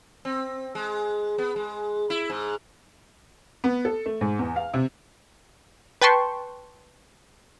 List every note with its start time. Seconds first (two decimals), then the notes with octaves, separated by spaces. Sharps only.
0.25 C4
0.75 G#3
1.38 B3
1.56 G#3
2.10 E4
2.30 G#2
3.64 B3
3.85 A4
4.06 A3
4.21 G#2
4.39 E2
4.56 F5
4.74 C3
6.02 B4 G5 A5 C6 C#6